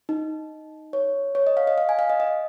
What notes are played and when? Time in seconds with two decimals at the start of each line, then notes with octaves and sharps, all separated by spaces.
0.09 D#4
0.93 C#5
1.35 C#5
1.47 D#5
1.57 F5
1.67 D#5
1.78 F5
1.89 G#5
1.99 F5
2.10 D#5
2.20 D#5